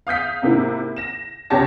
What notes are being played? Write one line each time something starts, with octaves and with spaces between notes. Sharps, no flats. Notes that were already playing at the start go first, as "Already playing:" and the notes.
F5 D#6 G6 B6
G#2 C3 A#3 E4
A#6 E7
C#2 C3 G4 C#5 A5 A#6